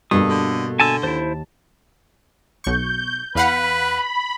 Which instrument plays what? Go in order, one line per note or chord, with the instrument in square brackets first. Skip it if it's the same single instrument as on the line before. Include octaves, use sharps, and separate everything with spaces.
[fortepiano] G2 [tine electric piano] B2 A#3 A4 [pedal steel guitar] D#6
[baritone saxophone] D3
[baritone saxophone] D3 [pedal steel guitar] G#5 A5 E6
[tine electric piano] D#2 A5 [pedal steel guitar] E4 C5
[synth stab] B1 C#6 [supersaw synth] G6
[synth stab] E2 F5 F#5 [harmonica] B4 [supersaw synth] B5